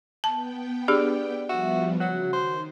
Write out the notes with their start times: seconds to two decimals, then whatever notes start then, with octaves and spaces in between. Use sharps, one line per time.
0.24 B3 G5 A5
0.88 D4 G4 G#4 D5
1.49 F3 G3 B3 F#4 E5
2.00 C#3 F#3 F#4
2.33 D#3 C5